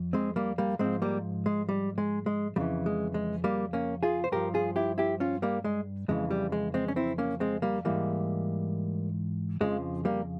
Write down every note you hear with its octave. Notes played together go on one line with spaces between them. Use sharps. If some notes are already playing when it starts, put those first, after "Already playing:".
Already playing: F2
G#3 C4
G3 A#3
G3 A#3
G#2 F3 G#3 C4
G3 A#3
G#3
G3
G#3
G#3
F2 C#3 E3 G3
G#3
G#3
G3 A#3
A#3 C#4
F4 G#4
C5
G2 F3 G4 A#4
F4 G#4
E4 G4
E4 G4
C#4 F4
G3 A#3
G#3
F2 C#3 E3 G#3
G3
G#3
G#3 C4
C#4
C4 E4
A#3 C#4
G#3 C4
G3 A#3
G#2 E3 G3 A#3
F2 C#3 F3 G#3
G3 A#3